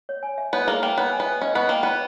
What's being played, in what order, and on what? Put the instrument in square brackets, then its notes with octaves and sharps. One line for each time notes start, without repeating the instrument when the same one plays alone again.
[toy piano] C#5
G#5
E5
[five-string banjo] B3 [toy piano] C#5
[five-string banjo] A#3 [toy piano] G#4
[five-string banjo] A#3 [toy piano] G5
[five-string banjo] B3 [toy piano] C#5
[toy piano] G#5
[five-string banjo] B3
[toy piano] E5
[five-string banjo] C#4 [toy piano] D#5
[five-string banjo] B3 [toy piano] C#6
[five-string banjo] A#3 [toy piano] G5
[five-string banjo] B3 [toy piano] C#5